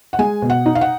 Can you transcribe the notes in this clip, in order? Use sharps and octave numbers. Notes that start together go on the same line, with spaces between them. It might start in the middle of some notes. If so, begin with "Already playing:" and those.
F#5
G#3 G#5
B2
F#5
D#4
F5
F#5